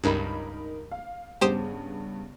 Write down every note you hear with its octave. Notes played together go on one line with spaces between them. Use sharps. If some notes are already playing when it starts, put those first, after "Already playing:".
C#2 G2 D#4 A#4 B5
F5
G2 C#3 B3 G4 C5 D#6